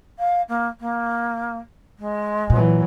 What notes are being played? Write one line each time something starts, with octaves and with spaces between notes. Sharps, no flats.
F5
A#3
A#3
G#3
A#2 E3 F#3